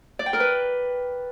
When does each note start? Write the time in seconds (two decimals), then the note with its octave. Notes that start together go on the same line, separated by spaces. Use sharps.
0.19 D5
0.26 G5
0.33 A#4
0.40 B4